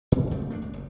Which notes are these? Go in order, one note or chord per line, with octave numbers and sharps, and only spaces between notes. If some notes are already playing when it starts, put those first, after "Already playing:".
A2 D3
F#2 C#3 A3 C4
A3 A#3 C4 D4
C#2
F#1